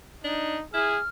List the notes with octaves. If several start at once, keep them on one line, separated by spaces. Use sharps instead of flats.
D4 D#4
E4 G#4 F6